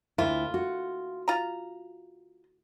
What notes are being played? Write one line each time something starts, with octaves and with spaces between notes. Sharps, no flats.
D2 A#3 E4 F4
F#4
F4 A#5